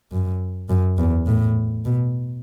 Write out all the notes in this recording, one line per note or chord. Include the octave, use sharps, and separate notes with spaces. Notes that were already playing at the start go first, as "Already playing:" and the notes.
F#2
F#2
E2
A2
B2